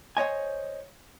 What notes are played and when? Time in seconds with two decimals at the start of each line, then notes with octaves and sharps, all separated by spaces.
0.17 C5 C#5 D#5 G#5